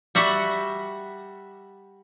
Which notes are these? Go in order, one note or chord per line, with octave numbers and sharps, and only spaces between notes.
G3 F#4 E5 F#5